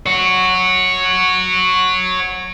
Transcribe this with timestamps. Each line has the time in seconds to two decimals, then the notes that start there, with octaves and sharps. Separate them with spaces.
0.06 C#5 F#5